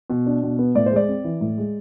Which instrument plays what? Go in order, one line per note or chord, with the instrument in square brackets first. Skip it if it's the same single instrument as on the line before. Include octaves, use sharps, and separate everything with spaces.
[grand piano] B2
D4
B2
B3
A2 D5
C5
G#3 D5
C4
E3
A2
G#3